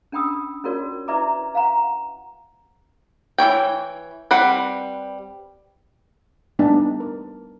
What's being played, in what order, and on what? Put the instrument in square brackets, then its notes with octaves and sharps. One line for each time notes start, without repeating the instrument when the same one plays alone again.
[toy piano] C#4 D4 G5 B5 D#6 E6
C#4 F4 F#4 A#4 C#5 D5
E4 B4 D5 E5 A#5 D6
F5 F#5 A#5
[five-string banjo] E3 F#3 C#5 G5
G3 C4 B4 F#5
[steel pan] G3 A3 B3 D4 D#4 A5
A#4